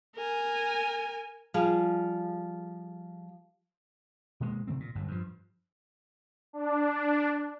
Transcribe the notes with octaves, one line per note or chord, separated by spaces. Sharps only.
A#4 G#5
F3 G3 G4 G#4
B2 D#3 G#3 A#3
C3 D#3 A3 C4
A#2
G1 F#2 A2
G2 F3
D4